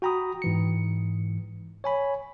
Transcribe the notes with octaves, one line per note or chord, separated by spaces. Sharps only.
F#4 G5 A#5 B5 D#6
G#2 E3 C#7
C#5 G#5 B5